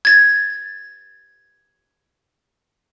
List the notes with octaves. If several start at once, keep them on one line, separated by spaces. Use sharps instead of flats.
G#6 A6